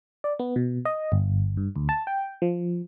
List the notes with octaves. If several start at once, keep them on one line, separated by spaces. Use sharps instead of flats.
D5
B3
B2
D#5
G1
G2
D2
A5
G5
F3